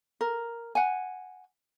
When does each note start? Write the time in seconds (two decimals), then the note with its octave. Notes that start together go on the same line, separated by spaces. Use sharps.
0.21 A#4
0.75 F#5 G#5